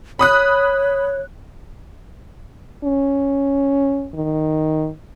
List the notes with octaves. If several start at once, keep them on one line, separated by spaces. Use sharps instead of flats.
C#5 B5 D#6 F#6
C#4
D#3